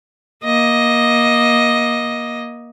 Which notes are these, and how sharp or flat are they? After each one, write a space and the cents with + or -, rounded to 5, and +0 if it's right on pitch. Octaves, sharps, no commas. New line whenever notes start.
A#3 +25 D#5 +5